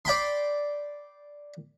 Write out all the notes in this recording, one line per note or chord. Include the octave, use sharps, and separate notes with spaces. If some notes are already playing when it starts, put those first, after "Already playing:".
D5 G5 B5 C6